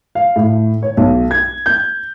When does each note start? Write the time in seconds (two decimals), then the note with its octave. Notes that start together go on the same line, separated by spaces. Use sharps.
0.15 F5
0.36 A2
0.83 C#5
0.97 B1
1.31 G#6
1.66 G6